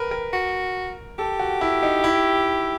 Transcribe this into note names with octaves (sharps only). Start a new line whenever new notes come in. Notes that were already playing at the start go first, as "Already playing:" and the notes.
Already playing: A#4 B4
A#4
F#4
G4 A4
F#4
E4
D#4
E4